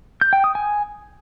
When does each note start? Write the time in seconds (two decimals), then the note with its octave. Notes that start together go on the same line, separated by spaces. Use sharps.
0.21 G6
0.33 G5
0.44 D#6
0.55 G#5